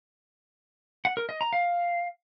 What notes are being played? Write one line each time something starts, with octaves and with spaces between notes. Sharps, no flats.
F#5
A#4
D#5
A#5
F5